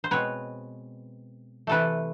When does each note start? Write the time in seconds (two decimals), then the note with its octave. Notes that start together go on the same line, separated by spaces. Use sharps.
0.04 C5
0.11 B2 G#3 C4 B4 C#5
1.67 C3 E3 A3 A4 B4